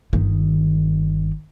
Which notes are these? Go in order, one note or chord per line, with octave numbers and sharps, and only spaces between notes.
G1 D#3